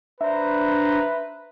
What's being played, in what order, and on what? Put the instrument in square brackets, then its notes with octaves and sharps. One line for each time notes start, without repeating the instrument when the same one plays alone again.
[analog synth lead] D4 [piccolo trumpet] B4 [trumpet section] C5 A#5 [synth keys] E5